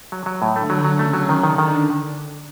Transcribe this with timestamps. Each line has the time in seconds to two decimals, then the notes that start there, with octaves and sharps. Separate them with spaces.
0.12 F#3
0.26 F#3
0.42 A2
0.56 D3 A3 D4
0.70 F#3
0.85 F#3
0.99 C#3 A3 C#4
1.13 F#3
1.29 D#3
1.43 D3 D#3 D4
1.58 D#3